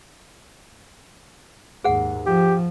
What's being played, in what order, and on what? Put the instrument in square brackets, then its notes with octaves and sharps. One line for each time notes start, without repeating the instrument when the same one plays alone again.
[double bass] D#2 G#2 [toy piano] G#4 F#5
[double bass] F3 [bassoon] G4